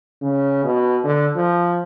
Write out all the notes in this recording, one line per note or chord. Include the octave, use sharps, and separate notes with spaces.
C#3
B2
D3
F3